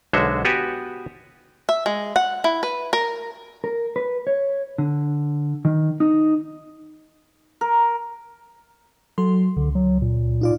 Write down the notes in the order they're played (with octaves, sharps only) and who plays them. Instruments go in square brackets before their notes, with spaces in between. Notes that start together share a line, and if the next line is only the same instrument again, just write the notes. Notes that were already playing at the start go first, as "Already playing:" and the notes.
[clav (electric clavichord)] B1 D3 G#3 F#4 C5 E5
B3 F#4 G4 B4 G#5
[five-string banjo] E5
G#3
F#5
E4
B4
A#4
[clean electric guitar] A#4
B4
C#5
D3
D#3
D#4
[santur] A#4
[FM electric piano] F#3 A4 C6
[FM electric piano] C#2 [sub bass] D3
[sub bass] F#3
A#2
[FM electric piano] D#4 F4 D5